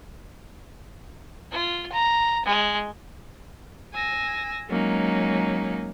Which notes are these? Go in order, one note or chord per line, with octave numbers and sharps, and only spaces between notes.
F4
A#5
G#3
G#5 E6 A#6
F#3 G#3 A#3 C#4 D#4